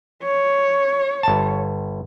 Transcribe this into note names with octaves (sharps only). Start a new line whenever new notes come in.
C#5
G1 A5